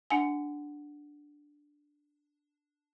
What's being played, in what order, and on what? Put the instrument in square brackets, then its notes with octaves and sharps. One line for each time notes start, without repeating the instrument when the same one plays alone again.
[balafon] D4 F#5 G#5